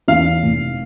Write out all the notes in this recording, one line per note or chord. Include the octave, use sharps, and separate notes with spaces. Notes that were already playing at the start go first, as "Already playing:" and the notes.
E2 F5
F1